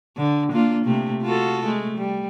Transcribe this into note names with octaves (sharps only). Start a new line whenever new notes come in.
D3
A#3 D4 F4
C3 A3
F4 F#4 A4
G#3 A3
G3